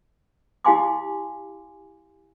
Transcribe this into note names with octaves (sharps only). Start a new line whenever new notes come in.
E4 G4 F5 G#5 C6 D6